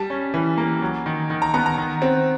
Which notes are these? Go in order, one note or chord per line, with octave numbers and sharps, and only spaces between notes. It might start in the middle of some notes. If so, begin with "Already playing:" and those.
Already playing: G3 A5
C#4
E3
A#3
F#3
D#3
D#3
A#5
B3 A#5
A#5
D#3
C4